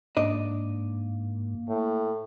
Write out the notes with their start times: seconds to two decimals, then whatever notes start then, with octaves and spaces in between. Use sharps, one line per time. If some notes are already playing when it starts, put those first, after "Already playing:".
0.17 G#2 A#3 D4 D#5
1.69 A2